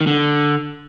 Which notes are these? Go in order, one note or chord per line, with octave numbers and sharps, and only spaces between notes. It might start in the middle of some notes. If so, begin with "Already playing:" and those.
D#3
D3